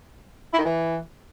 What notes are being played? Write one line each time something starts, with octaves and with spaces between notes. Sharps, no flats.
E4
D#3
E3